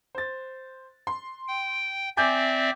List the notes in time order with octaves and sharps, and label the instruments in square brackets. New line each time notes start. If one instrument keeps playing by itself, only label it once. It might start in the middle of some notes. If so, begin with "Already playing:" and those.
[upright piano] C5 A6
C6
[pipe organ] G5
[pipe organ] C4 D5 E5 [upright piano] G#5 D6 G6